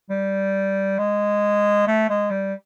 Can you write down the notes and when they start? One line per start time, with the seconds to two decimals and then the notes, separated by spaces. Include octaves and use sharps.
0.10 G3
0.99 G#3
1.87 A3
2.10 G#3
2.31 G3